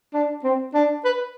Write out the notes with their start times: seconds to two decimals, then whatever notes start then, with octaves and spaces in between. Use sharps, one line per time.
0.14 D4
0.44 C4
0.74 D4
1.05 B4